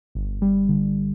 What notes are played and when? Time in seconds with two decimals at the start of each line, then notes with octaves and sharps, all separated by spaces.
0.15 G1
0.42 G3
0.69 D3